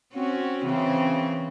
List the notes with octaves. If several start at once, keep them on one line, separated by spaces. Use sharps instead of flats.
C4 C#4 F#4
C#3 E3 C4